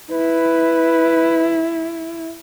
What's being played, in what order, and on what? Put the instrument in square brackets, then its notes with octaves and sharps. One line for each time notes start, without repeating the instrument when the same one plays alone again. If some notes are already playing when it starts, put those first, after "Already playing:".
[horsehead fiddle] E4 [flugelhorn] B4